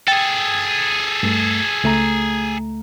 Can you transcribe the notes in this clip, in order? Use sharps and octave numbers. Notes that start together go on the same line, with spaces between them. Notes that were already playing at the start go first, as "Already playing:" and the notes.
G#4 A4 G5
G2 A3
C#2 A3 A#5